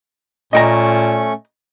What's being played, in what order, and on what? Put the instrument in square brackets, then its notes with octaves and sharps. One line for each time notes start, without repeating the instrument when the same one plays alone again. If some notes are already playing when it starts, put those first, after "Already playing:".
[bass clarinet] A#2 [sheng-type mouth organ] A3 C#4 C#6 [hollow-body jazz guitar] D#5 G5 A#5